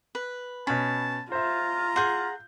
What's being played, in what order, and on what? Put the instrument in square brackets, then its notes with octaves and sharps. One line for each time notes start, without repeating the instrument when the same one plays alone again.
[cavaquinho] B4
[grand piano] B2 C#4 [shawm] A5 [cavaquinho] B5
[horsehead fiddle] F4 [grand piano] C5 E5 [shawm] A#5
[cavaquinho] G#4 F#5 [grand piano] C6 G6